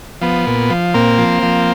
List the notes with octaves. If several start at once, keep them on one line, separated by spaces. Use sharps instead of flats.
F3 B3
A#2
F3
A#2 A#3 C4
F3
F3